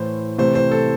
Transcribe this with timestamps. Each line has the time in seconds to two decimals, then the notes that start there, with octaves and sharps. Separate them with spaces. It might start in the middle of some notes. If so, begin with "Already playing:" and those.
Already playing: A2 E3 A3 C5
0.38 C3 E3 A3 C4 C5
0.55 C5
0.71 A4